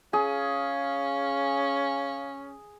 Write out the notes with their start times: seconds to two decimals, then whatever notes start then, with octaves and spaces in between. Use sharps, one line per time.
0.13 C#4 G#4 F5